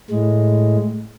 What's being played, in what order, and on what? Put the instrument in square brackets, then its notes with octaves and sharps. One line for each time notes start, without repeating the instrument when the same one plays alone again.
[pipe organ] A2 G#3